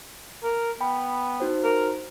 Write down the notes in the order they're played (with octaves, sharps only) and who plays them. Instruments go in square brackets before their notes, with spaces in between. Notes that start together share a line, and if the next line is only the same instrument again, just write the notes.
[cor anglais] A#4
[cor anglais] B3 [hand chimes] G5 B5
[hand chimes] D#4 F#4 C5
[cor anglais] A#4